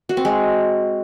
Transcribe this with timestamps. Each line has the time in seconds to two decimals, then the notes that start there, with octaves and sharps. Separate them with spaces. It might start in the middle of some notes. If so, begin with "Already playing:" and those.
0.09 F#4
0.17 C4
0.25 G#3